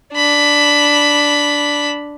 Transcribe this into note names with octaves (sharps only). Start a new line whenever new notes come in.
D4 B5